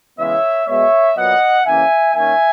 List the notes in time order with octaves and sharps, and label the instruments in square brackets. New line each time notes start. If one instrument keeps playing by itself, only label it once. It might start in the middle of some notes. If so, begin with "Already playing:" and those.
[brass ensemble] C#3 E3 G#3 B3 C#5 E5
B2 G#3 B3 C#5 E5
A#2 F#3 B3 D#5 F#5
C#3 E3 A#3 C#4 E5 G#5
D#3 A#3 C#4 E5 G#5